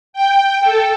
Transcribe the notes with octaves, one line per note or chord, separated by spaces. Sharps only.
G5
A4